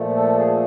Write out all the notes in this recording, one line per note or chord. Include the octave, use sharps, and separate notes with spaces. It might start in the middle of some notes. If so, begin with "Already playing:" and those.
Already playing: A#2 F3 A3
A4
G#4